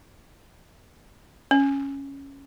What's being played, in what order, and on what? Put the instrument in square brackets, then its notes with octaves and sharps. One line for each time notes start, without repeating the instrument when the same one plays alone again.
[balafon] C#4